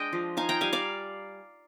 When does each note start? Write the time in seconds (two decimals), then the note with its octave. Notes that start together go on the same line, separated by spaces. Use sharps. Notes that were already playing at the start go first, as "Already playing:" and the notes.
Already playing: G#3 D4 D#5 G5
0.13 F3
0.37 D#4 F5 G#5
0.49 G5 A#5
0.61 G3 F5 G#5
0.73 D5 F5